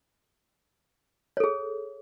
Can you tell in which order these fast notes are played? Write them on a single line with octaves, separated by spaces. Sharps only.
C#5 A4 G#4